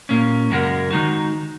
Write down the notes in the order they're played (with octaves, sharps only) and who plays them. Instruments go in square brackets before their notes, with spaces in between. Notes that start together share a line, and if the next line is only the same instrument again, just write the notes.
[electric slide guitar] A#2 A#3 C#4
F#2 C#3 G#3 F#4 A#4
D#3 G#3 D#4 F#4